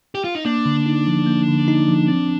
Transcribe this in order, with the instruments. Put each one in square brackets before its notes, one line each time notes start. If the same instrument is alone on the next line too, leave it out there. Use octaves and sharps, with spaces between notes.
[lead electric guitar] G4
F4
D#4
[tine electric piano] A#3 [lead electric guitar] D4
[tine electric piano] D3
D#4
F3
A#3
D3
D#4
F3
C4